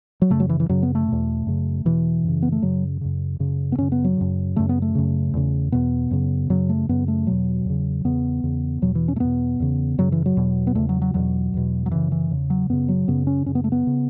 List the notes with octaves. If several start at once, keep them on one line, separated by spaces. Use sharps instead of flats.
F#3
F#2 C#3 A3
F#3
E3
E3
F#2 C#3 F#3
B3
A3
E2 B2
F#2 C#3
E2 B2 E3
F#2 C#3
B3
A3
F#2 C#3 F#3
F#2 C#3
F#2 C#3
B3
F#2 C#3 C#4
B3
F#3
F#2 C#3
F#2 C#3 A3
B3
A3
F#2 C#3
E2 C#3
E2 B2 B3
F#2 C#3
F#2 C#3 F#3
A3
F#2 C#3 B3
A3
E2 B2 F#3
E2 C#3
E2 C#3 B3
E2 C#3
E2 B2 F#3
E3
C#4
A3
E2 B2 B3
E2 C#3
F#2 C#3 F#3
E3
F#3
E2 B2
B3
E2 C#3 A3
F#3
F#3
E2 B2 F#3
E2 B2
F#3
F#2 C#3 E3
E3
E2 C#3
F#3
F#2 C#3 B3
F#3
F#2 C#3 B3
C#4
F#2 C#3 C#4
B3
A3
B3
C#3